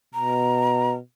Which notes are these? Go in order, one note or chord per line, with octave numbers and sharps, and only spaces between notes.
B2 A#5